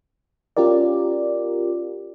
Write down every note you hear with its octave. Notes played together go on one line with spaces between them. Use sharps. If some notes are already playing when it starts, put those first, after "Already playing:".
C#4 F4 G4 A#4 D5